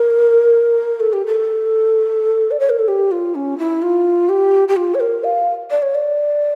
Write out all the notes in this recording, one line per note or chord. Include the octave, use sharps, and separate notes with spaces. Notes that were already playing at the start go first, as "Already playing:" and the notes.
Already playing: A#4
A4
G4
A4
D5
C#5
A#4
A4
G4
F4
C#4
E4
F4
G4
G4
F4
C#5
A#4
F5
D5
C#5
D5